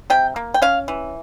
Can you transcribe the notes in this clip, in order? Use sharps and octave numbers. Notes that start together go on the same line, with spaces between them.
C3 G5
A#3
G5
C#4 F5
E3